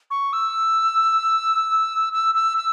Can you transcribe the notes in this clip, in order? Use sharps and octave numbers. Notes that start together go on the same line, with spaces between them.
C#6
E6
E6
E6
E6